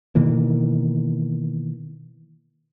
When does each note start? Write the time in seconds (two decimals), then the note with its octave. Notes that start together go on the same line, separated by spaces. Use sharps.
0.15 B2 D#3 E3 A#3